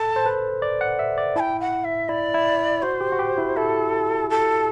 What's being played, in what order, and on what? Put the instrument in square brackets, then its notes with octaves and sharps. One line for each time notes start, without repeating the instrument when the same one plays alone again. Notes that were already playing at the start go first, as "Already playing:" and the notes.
Already playing: [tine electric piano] A4 [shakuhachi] A5
[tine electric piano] C5
B4
D5
F#5
E5
D5
[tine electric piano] E4 [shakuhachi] A5
[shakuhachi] G5
F#5
E5
[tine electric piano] E4 [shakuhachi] D5
[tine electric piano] E4
[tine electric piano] F#4 [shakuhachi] C5
[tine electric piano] G4
F#4
G4
E4
[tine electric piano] E4 [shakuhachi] A4
[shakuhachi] A4